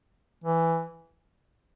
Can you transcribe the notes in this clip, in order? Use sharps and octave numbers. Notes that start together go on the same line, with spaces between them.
E3